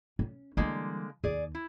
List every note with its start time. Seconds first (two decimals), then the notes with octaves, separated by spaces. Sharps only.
0.19 C#4
0.57 D3 E3 G3 G#3 A#3
1.24 D#2 G#4 D5
1.55 E4